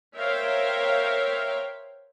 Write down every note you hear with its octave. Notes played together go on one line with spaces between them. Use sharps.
A#4 C5 C#5 E5 F5 G5